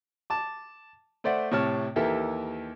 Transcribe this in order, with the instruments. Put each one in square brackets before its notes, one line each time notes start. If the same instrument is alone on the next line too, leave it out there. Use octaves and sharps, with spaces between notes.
[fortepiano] A5 D6
A3 C5 D5 E5 F#5
A2 C3 C#5 A5 F6
D#2 E3 G4 A4 A#4 E5